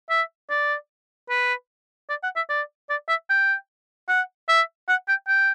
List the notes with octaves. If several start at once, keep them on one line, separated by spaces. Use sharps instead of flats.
E5
D5
B4
D5
F#5
E5
D5
D5
E5
G5
F#5
E5
F#5
G5
G5